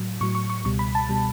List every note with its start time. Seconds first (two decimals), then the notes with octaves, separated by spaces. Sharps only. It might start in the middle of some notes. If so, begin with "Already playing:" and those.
Already playing: A2 F#3
0.21 A2 F#3 C#6
0.35 C#6
0.50 C#6
0.65 C#2 B2 G3 C#6
0.79 B5
0.95 A5
1.09 B2 G3